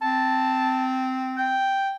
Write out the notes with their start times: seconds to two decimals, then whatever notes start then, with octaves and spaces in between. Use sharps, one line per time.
0.02 C4 A5
1.38 G5